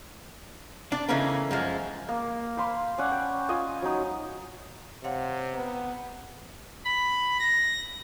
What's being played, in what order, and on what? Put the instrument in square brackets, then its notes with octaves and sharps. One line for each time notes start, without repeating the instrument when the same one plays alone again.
[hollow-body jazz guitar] D4 D5
C#3 E3 A3 A#3 C#4 D#4
F#2 F3 G#3
[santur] A#3
C5 F5 B5 C6
C#4 D5 F#5
G5
F4 D#5 G#5
F#3 D#4
[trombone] C3 [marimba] C#5 F5 F#5
[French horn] B3 [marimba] A#5
[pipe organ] B5
A#6